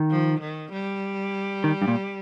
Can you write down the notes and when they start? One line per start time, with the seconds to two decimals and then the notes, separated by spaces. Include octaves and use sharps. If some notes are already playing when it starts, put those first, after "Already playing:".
Already playing: D#3
0.11 F3
0.41 D#3
0.72 G3
1.64 D#3
1.82 G2
1.88 A#2